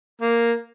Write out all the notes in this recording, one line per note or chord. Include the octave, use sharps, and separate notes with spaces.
A#3